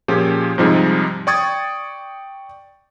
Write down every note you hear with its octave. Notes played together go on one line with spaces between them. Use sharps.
A#2 F3 C#4 G4 G#4
G#2 C3 F3 G3 D#4 G#4
D5 G5 C#6 D#6 G#6 A6